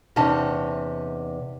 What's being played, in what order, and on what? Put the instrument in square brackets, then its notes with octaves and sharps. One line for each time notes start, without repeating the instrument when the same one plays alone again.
[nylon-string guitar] E2 C3 C#4 D#4 A5